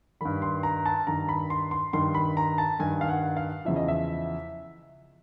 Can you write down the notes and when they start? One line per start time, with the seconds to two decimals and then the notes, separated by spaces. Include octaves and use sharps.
0.21 G2 D#3 B5
0.42 C6
0.63 A#5
0.86 A5
1.07 G2 D#3 A#5
1.29 B5
1.50 C6
1.71 C6
1.93 G2 D#3 C6
2.15 B5
2.37 A#5
2.58 A5
2.79 G2 D#3 G#5
3.01 F5
3.08 F#5
3.36 F5
3.65 E2 C#3 F3 E5
3.76 D#5
3.88 E5